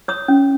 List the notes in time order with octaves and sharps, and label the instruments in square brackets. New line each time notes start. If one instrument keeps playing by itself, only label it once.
[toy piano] C#5 D#6
C#4